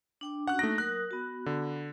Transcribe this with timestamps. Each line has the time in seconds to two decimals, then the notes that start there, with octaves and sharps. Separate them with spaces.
0.21 D4 G5 D6
0.47 C#4 D4 F#4 F#5 F#6
0.59 A3 A#3 D#4 A#6
0.78 F#3 A#4 D#6 F#6
1.11 B3 F#4
1.46 D3